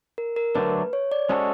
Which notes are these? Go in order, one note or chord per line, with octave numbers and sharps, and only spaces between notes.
A#4
A#4
D3 F#3 A3 D4 B4
C#5
D5
G#3 C#4 F#4 A4 C5 C#5